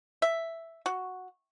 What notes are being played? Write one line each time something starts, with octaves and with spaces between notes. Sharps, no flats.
E5
F#4